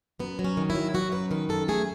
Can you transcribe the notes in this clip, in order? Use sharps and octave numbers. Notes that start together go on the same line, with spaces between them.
F#2 B3
F#3
C#4
D#3
E4
F#3
F#3 F#4
F#2 B4
D#3 B4
F#2 A4
A3 G#4